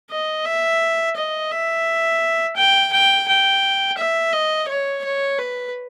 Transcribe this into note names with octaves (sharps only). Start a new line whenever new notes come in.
D#5
E5
D#5
E5
G5
G5
G5
E5
D#5
C#5
C#5
B4